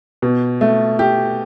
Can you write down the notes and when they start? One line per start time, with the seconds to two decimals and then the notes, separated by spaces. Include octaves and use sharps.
0.22 B2
0.61 A3
0.99 G4